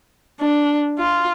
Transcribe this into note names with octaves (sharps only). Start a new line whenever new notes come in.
D4
F4